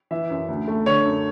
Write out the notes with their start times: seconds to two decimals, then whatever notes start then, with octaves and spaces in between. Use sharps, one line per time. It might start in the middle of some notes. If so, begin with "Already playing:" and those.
0.11 E3 E5
0.30 F#2
0.48 D2
0.68 A3
0.86 D3 C#5
1.05 F#2